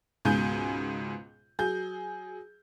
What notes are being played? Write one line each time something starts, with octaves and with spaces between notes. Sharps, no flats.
C#2 G#2 B2 G#5 G6
F#3 G#4 G6